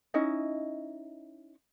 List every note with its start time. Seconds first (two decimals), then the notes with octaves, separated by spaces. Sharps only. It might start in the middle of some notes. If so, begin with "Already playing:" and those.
0.14 C#4 D#4 E4 D#5